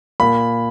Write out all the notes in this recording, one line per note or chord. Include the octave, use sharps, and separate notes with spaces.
A#2 B5